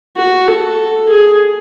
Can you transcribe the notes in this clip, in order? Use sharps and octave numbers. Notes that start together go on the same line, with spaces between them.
F#4
A4
G#4